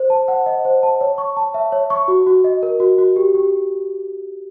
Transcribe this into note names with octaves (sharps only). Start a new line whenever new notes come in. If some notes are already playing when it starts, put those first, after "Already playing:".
Already playing: C5
A5
F#5
D#5
C5
A5
C#5
C#6
A5
E5
C#5
C#6
F#4
F#4
D#5
A#4
F#4
F#4
G4
G4